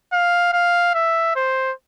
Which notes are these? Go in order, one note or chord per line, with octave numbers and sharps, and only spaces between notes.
F5
F5
E5
C5